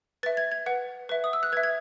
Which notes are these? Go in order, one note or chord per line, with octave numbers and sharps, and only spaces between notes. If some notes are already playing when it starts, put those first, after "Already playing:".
B4 E5 A6
G#6
G#6
B4 F#5
B4 E5
D#6
E6
F#6
B4 E5 G#6
G#6